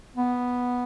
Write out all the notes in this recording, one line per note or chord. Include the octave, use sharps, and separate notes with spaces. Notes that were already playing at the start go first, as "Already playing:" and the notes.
B3